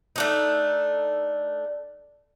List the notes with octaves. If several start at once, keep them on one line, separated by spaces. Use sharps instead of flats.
A3 D4 D#4